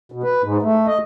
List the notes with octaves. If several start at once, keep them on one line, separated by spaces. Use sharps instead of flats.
B2
B4
G#2
A3
D#5